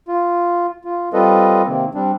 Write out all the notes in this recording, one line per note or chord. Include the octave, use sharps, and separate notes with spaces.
F4
F4
G3 C4 F4 A4 B4 D#5
C3 D#3 A#3 C4
G3 C4 D4